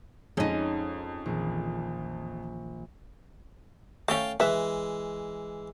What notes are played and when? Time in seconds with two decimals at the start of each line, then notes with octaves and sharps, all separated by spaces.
0.37 F2 G#3 C#4 D#4
1.26 A#1 D#3 E3 G#4
4.08 A3 C#4 F5 G5 A5
4.40 E3 G#3 B4 E5